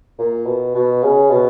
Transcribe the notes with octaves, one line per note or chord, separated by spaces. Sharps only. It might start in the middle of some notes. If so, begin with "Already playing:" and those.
A#2
B2
B2
C#3
B2